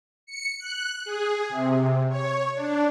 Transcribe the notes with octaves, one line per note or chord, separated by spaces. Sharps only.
C#7
F#6
G#4
C3
C#5
D4